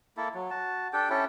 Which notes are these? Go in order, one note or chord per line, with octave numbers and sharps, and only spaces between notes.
A#3 E4 A4
F#3
F#4 A5
D4 G4 A4 G5
C#4 E4 G4 A4